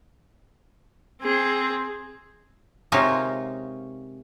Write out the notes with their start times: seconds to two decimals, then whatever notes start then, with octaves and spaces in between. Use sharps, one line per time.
1.22 C4 G#4
2.92 C3 G#3 A#3 C#4 D#4 F4